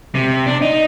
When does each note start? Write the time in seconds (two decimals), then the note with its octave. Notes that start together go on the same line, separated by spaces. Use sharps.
0.15 C3
0.46 D4
0.62 D#4